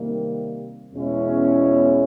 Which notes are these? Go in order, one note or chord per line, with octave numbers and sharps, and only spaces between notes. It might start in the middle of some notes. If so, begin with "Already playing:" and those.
Already playing: C3 D#3 G3 A#3
E2 B2 G#3 C#4 E4